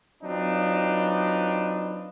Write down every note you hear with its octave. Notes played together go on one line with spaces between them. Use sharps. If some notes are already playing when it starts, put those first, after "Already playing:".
F#3 C4 D4 D#4 F4 B4